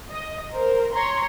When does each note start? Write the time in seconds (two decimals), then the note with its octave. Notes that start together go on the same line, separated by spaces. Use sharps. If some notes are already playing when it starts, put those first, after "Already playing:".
0.11 D#5
0.53 A#4 C5
0.93 C#5 A#5 C6